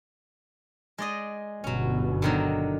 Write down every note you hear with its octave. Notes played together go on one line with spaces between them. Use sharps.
G#3 D5 D#5
G1 B2 F#3 C#4
D3 D#3 F#3